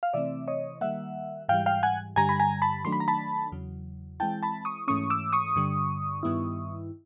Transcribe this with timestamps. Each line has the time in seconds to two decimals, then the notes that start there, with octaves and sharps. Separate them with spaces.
0.03 F5
0.13 C3 E3 A3 C4 D5 E5
0.48 C#5 D#5
0.81 D#3 G3 A#3 E5 F#5
1.49 G#2 E3 G3 F5 G5
1.66 F5 G5
1.83 F#5 G#5
2.16 G2 D3 G3 G#5 A#5
2.29 B5
2.40 G#5 A#5
2.62 A5 B5
2.84 D#3 F#3 A3 D4 C6
2.92 B5
3.00 A#5
3.08 A5 B5
3.52 E2 C#3 F#3
4.20 E3 G#3 C4 E4 G5 A5
4.43 A5 B5
4.65 C#6 D#6
4.88 G#2 E3 A3 C#4 C#6 D#6
5.10 D6 E6
5.33 C#6 D#6
5.56 G2 D3 G3
6.23 G2 D#3 G3 B3 E4